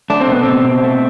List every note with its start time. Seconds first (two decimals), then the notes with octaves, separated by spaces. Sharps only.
0.10 A3 D4
0.21 C4
0.28 B2 B3
0.43 B2 C4
0.65 B2
0.83 A3